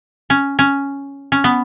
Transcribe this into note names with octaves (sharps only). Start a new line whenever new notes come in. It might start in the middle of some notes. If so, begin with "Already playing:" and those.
C#4
C#4
C#4
B3